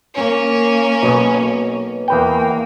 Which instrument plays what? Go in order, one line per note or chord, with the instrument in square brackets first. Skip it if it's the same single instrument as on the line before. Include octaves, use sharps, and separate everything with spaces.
[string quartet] A#3 C#4
[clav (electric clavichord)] B1 B2
[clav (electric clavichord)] E2 B4 G5 [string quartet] A#3